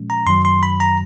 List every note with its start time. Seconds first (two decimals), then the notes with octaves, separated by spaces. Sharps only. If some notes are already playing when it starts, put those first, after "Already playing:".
Already playing: A#2 F3 G#3 C#4
0.10 A#5
0.27 F#2 D#3 F#3 C6
0.45 C6
0.63 B5
0.80 A#5